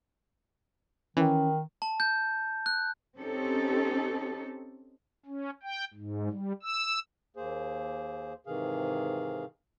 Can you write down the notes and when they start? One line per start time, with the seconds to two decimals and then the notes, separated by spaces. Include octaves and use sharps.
1.17 D#3 E3 C#4
1.82 A5
2.00 G6
2.66 F#6
3.17 C4 C#4 D#4 G4 A4
5.26 C#4
5.63 G5
5.94 G#2
6.30 G3
6.63 E6
7.36 D#2 A#3 G#4 C5
8.47 G#2 C3 D#3 E3 G#4 F5